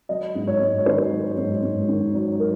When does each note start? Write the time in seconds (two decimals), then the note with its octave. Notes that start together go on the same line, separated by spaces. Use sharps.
0.09 F#3 D#5
0.35 G#2
0.47 C#5
0.61 G#2
0.79 C#5
0.86 D#3 C5
1.12 F#3
1.37 G#2
1.63 G#2
1.88 D#3
2.14 F#3
2.40 A#4